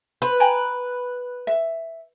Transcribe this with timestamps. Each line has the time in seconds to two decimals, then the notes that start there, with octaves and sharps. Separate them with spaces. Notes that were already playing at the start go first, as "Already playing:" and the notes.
0.22 B4 C5
0.40 G5 G#5 A#5
1.47 E5